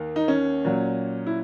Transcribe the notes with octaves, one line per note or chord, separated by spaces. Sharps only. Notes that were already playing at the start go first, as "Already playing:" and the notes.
Already playing: D#2 D#3
D#4
C#4
A#2 F#3
E4